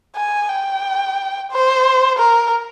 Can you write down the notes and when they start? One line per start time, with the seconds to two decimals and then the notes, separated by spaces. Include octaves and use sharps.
0.16 G#5
0.49 G5
1.52 C5
2.19 A#4